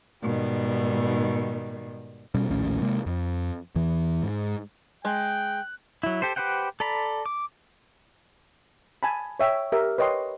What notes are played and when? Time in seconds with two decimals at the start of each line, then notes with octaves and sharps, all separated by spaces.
0.21 G#2 B2 D#3 G3
2.35 B2 G3 C#4
2.49 A#1 D#2 A2 C#4
2.82 C3 G#3 A#3
3.06 F2
3.75 E2 E3
4.22 G#2
5.05 G#3 G5 F#6
6.03 F#3 E4
6.22 G4 A4 C5
6.36 G4 B4 C5 F#5 G5
6.80 A4 D5 A#5 B5
7.26 D6
9.03 G#5 A5 B5
9.40 C#5 E5 G5
9.72 G4 A#4 E5
9.98 B4 C#5 D#5 G5 C6